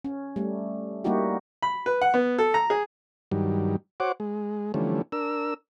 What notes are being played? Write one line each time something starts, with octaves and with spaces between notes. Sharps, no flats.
C#4
G3 A3
G3 A#3 D#4 E4 F#4 G4
B5
B4
F#5
B3
A4
A#5
G#4
G2 D#3 F#3 G3
F#4 C5 C#5 F#5 D6
G#3
D3 E3 F3 G3 A3 C#4
D4 A#4 E6